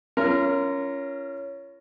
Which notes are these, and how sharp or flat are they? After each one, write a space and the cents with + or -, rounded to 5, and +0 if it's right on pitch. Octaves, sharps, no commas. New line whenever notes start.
C#4 +5 F4 -35 A#4 +0